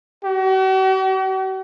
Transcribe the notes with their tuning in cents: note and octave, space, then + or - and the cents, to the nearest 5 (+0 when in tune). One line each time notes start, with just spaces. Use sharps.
F#4 +45